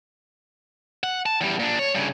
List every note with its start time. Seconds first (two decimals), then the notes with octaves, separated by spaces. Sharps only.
1.04 F#5
1.26 A5
1.41 E2 G3
1.59 A#2 D4
1.79 C#5
1.95 G2 C#3